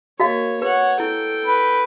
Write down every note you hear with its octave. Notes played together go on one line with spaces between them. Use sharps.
A#3 F#4 C#5 D#5 F5
B4 C#5 F#5
E4 A4 G5
B4